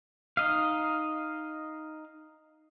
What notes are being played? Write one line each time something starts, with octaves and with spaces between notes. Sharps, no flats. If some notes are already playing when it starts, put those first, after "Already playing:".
D#4 D#5 F5